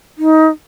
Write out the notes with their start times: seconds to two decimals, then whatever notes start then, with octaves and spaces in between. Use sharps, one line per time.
0.18 D#4